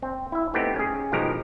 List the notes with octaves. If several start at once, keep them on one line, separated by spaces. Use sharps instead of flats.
C4
E4 E5
A3 B3 C4 D#4 G4
C#4 G#4
B2 D#3 F3 G#3 G4 A#4